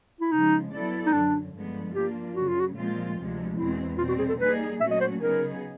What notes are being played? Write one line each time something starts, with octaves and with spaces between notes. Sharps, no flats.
E4
C#3 F3 G#3 D#4
F#3 B3 E4 A4 D5
D#4
F#2 D3 F#3 D4
G2 D3 F3 G#3 B3
F3 A#3 D4 F4 G4
F#2 C#3 F#3 F#4
F4
F#4
A#2 F3 G#3 C4 F4
D2 C3 F3 G#3
E2 B2 G#3 C4 E4
B2 G3 C4 F4
F#4
G#4
A4
G3 A#3 D#4 G#4 B4
A#2 F#3 A3 C#4 F#4 E5
D#5
C5
C#3 F#3 B3 D#4 G#4 A#4